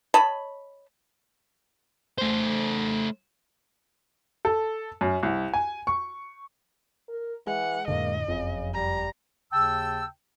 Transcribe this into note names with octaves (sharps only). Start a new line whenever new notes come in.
C#5 D#5 A5 B5
A3 C5
A4
F#2
C2
G#5
C#6
A#4
E3 G#3 F#5
F2 A2 D3 A#3 D#5
F#1 F2 C#3
G3 A#5
D#2 C#3 G5 A5 E6